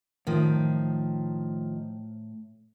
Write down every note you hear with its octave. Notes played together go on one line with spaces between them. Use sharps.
A2 D#3 F3